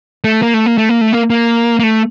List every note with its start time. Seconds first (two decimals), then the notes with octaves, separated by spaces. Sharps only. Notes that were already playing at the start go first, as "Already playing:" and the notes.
0.24 A3
0.42 A#3
0.54 A3
0.66 A#3
0.78 A3
0.89 A#3
1.01 A3
1.13 A#3
1.30 A#3
1.79 A#3
1.83 A3